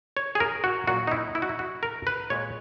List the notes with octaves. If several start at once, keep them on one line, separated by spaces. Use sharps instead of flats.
C#5
G#4
A#4
F#4
A#2 F#3 F#4
D#4
E4
E4
F#4
E4
F#4
A#4
B4
A#2 G#3 C#5